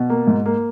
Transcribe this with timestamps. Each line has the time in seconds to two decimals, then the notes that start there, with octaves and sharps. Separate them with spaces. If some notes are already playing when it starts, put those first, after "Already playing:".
Already playing: B2
0.10 A#3
0.27 G#2
0.46 A#3